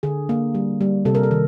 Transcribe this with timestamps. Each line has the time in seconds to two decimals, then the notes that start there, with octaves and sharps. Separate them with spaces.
0.03 D3 G#4
0.29 A#3
0.55 G3
0.81 G3
1.05 C3 A4
1.15 A#4
1.23 A4
1.31 D#3